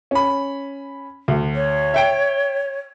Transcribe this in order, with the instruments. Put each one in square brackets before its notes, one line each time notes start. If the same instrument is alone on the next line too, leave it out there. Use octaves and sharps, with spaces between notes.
[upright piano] C#4 B5
D2
[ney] C#5
[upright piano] E5 G5 D7